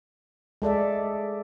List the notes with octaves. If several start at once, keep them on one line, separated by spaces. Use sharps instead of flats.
G#3 A4 D5 E5